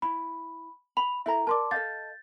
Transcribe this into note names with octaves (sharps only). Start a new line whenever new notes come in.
E4 B5
B5 F7
E4 A4 E5 A#5
A#4 D5 A5 C6 D6
A4 D#5 F5 G6 A6